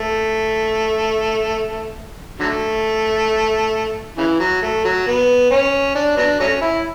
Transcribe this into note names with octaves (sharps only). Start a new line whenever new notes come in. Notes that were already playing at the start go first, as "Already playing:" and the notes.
Already playing: A3
D3 F#3 A3
C#3 E3
F#3
A3
F#3
B3
C#4
D4
F#3 B3 D4
F#3 A3 C#4
E4